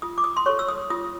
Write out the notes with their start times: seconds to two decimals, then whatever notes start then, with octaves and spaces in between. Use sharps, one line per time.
0.02 F4 D#6
0.18 D6
0.24 D#6
0.37 C6
0.46 A4 C#5 C#6
0.59 E6
0.69 D#6
0.90 F4 D#6